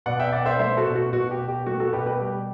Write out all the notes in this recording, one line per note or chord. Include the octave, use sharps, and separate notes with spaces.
B2 D5 F#5
E5 G5
B2 D5 F#5
C5 E5
A3 C5 E5
F#4 A4
B2
F#4
B2 F#4
G4
B2
G4
A3 F#4
F#4 A4
B2 G4 B4
G4 B4
G3 G4